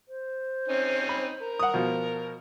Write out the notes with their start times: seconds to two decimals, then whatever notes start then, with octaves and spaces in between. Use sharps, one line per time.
0.08 C5
0.68 C4 C#4 D#4
1.09 B5
1.42 A#4
1.59 F#5 D#6
1.74 B2 F3